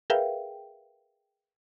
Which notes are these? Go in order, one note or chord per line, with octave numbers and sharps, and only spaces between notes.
G#4 A#4 B4 E5 F5 G5